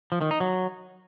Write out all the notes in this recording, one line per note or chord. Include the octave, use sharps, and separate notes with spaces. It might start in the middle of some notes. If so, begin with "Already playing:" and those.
F3
D#3
D#4
F#3